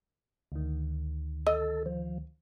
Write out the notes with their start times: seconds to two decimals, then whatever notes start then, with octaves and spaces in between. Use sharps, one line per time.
0.52 D2 D#3
1.47 A4 D#5
1.86 F3